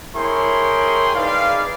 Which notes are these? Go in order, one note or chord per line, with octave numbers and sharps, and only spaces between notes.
E4 G#4 A#4 C#5 G5 C6
D#4 G#4 B4 D5 F5